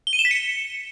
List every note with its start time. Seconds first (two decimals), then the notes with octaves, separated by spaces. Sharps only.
0.07 G7
0.13 D#7
0.19 E7
0.25 B6
0.31 C#7